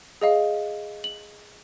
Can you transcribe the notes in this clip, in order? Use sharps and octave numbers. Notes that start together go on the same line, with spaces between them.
G#4 D#5 F5
F#7